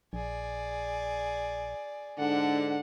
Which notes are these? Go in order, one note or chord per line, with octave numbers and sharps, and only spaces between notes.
A#1 G#4 D5
G#2 D3 D4 F#5